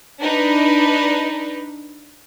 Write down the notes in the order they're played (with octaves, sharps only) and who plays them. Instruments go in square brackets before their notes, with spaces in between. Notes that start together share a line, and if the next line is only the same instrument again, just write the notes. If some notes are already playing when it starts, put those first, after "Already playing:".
[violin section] D4 D#4 B4